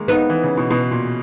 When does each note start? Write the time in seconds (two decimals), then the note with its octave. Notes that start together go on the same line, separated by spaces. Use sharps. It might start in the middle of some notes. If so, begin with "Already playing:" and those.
Already playing: D#3 G#3 A#3
0.08 B3 D#4
0.30 E3
0.43 C#3
0.57 B2
0.71 B2
0.91 A#2